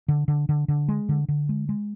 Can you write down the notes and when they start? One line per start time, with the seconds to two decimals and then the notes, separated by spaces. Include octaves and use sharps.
0.08 D3
0.28 D3
0.49 D3
0.68 D3
0.88 G#3
1.09 D3
1.28 D3
1.49 G#3
1.69 G#3